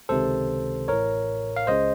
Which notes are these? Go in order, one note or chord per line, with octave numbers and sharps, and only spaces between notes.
C#2 C3 D#3 A4 C5
A1 A2 A#4 C#5
F5
C#2 C#3 C5 D#5